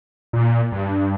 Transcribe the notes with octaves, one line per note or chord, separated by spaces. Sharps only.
A#2
G2